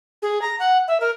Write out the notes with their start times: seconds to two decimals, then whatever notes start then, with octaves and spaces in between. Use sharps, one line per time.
0.22 G#4
0.42 A#5
0.59 F#5
0.88 E5
1.00 A#4